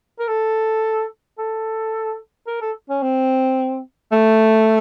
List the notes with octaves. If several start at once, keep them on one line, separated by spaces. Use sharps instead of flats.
A#4
A4
A4
A#4
A4
C#4
C4
A3